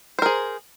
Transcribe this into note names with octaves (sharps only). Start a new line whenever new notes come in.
G#4 A#4 C5